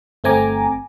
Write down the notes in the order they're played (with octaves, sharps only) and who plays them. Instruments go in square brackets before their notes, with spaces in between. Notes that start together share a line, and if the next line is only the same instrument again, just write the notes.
[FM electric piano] G1 A3 C4 G#5 A#5 D6